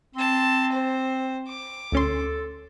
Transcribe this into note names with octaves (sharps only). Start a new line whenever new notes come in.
C4 A5 C6
C5
D6
D2 C#4 A4 C6